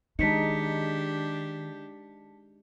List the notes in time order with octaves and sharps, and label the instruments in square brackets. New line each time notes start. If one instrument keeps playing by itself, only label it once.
[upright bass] D#3 [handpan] G#3 D#4 [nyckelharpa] D4 G4 [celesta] A5 B6 C#7